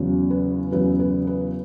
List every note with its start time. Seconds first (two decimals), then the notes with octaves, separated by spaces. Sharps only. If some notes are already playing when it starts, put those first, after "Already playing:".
Already playing: E2 C#3 F#3
0.31 B4
0.72 E2 C#3 F#3 B4
0.99 B4
1.27 B4